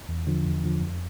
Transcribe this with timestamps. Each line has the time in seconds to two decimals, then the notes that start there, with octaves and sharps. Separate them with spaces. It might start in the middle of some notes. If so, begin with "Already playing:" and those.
0.09 E2
0.27 D3 F3
0.46 E2
0.64 D3 F3
0.82 F2